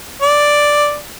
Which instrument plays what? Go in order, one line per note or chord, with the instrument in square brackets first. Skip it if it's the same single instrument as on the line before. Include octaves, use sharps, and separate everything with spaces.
[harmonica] D5